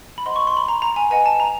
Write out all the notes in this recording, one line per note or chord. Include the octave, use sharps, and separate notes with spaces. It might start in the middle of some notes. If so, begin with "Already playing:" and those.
B5
C5 D#5 F#5 C6
C#6
C6
B5
A#5
A#5
G#5
B4 D#5 F#5 G#5
A5
A#5